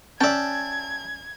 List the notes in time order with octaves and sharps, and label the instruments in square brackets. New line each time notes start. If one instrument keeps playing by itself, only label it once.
[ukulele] C#4 D5 [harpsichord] E5 G5 [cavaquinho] A5 [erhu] G#6